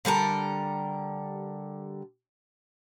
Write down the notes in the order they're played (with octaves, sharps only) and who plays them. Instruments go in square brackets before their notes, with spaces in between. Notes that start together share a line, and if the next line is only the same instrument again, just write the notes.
[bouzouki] D3 G3 A4 A#4